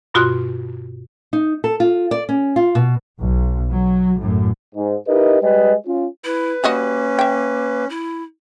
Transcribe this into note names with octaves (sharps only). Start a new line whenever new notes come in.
G2 B2 F4 F#4 C6 F#6
D#4
A4
F4
D5
C#4
F4
B2
B1
F#3
F#2 A2
G#2
D#4 E4 G4 A#4 B4 D#5
G3 G#3 B4 D#5
C#4 F4
E4 B4
G3 A#3 C#4 F#4 D#5
E5 G5
E4